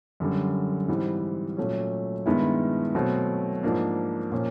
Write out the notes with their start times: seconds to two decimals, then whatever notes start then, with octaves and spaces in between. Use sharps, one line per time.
0.20 F#2 D3 G3
0.88 G#2 E3 G3 C4
1.57 A#2 F#3 A3 C#4
2.26 G2 D#3 G#3 B3 E4
2.95 B2 F#3 A3 C4
3.63 G#2 F3 A#3 D4
4.32 A#2 F3 A#3 C#4